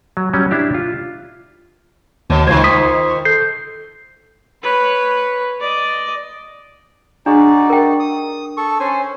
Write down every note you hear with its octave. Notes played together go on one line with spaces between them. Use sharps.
F#3
F#3 G3 C#4
D4 E4 G4
F4
D#2 B2 C#5
C#2 D#3 F4 C5 G#6
C6 D#6 B6
A4 G6 C7
B4 C#5
D5 D#5
D4 D#4 F#4 G#4 D5
A#4 G5
D#6
A4 C#6
C#4 C5 G#5